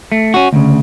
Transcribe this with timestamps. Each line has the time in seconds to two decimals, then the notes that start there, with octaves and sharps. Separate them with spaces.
0.12 A3
0.34 C#4 F#4
0.53 D2 C#3